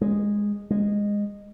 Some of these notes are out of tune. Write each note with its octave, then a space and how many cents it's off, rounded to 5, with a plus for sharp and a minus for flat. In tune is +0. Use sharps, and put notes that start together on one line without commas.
G#3 -10
G#3 -15